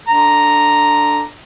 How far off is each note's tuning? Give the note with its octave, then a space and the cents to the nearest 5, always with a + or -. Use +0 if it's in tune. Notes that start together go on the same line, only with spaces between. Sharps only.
D3 +0 A#5 +0